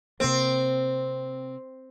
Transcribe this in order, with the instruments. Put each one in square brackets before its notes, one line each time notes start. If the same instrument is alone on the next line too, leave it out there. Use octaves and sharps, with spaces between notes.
[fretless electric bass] C3 A#3 [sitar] C4